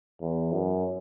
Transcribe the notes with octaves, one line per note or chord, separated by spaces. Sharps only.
E2
F#2